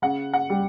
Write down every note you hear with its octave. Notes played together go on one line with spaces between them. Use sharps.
C#3 F#5
F#5
G3